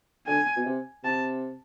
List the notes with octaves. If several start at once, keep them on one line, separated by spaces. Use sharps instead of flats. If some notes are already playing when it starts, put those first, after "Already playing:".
D3 G#5
B2
C3
C3 A5